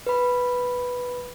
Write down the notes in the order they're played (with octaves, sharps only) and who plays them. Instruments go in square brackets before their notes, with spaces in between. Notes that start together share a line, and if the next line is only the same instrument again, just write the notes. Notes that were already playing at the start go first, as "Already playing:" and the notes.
[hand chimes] B4 B5